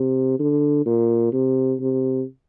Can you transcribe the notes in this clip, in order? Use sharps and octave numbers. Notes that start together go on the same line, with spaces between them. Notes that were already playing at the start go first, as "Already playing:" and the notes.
Already playing: C3
D3
A#2
C3
C3